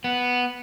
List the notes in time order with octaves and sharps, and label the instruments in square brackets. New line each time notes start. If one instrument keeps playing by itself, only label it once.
[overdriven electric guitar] B3